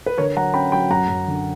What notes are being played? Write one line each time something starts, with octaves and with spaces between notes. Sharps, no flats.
B4
D3 A#4 C#5
F#3 F#5 A#5
C#4 G5 B5
F#3 G5 B5
F#2 F#5 A#5
F#2
D3